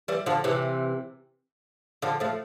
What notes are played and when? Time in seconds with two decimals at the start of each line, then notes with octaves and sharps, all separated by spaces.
0.08 E3 G3
0.26 D3 F3
0.44 C3 E3
2.02 D3 F3
2.20 F3 A3